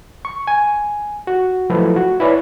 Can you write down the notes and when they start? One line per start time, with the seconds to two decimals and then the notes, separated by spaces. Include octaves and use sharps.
0.25 C#6
0.47 G#5
1.27 F#4
1.70 F3 F#3 A3 E4 A4 B4
1.96 F#4
2.20 E4 B4 C#5 D5